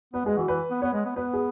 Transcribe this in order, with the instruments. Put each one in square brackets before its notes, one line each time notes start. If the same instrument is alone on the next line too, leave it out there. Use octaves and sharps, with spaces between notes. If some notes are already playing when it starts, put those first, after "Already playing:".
[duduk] B3 [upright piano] B4
[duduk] G#3 [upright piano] G#4
[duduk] E3 [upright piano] F#4
[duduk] E3 [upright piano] B4
[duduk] B3
[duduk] B3 [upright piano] C#5
[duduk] G#3
B3
[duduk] B3 [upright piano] B4
[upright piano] G#4